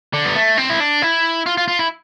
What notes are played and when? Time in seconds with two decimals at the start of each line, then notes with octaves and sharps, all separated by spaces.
0.13 D3
0.25 B3
0.35 A3
0.58 C4
0.70 E4
0.80 D4
1.02 E4
1.46 F4
1.57 F4
1.68 F4
1.79 E4